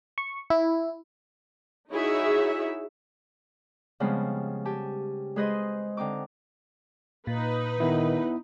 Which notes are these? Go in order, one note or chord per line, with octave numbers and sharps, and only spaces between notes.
C#6
E4
D#4 E4 F#4 G#4 C#5 E5
C#3 F3 G3 G#3 B3 C4
G4 G#5 A5
G#3 G#4 B4 C5 D#5 C6
D3 C4 D#4 D6
A#2 D#4 B4
D#3 B3 E4